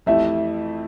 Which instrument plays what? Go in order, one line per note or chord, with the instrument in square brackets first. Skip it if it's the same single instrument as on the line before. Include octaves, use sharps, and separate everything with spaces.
[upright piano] F2 E3 A3 E4 G4 [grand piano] E5